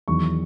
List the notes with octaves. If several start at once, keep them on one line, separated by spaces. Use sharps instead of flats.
E2 D#3 F#3 C#6